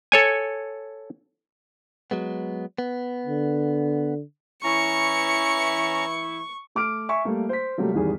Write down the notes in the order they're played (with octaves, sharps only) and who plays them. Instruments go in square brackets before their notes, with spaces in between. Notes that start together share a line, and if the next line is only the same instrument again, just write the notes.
[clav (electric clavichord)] A4 C#5 G#5
[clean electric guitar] F#3 G#3 B3
B3
[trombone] D3
[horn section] E3 E4 [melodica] C#4 A#5 [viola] C#6 [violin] C#7
[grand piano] A3 D6 F6 D7
E5 G#5 C#6
G3 A3 A#3
C5 B6
C3 F#3 G3 A3 A#3
G#1 E2 D#3 G3 G#4